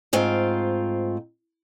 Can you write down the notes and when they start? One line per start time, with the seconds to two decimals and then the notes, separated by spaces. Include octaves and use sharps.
0.13 G#2 A3 C4 F4